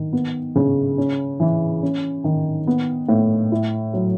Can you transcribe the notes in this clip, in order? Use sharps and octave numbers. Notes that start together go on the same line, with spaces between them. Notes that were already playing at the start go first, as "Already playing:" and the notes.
Already playing: D#3
B3
C#3
C#4
E3
C#4
D#3
B3
A2
E4
F#3